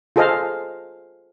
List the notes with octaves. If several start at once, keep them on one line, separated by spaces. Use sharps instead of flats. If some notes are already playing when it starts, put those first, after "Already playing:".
F4 G#4 A4 C5 D#5 F5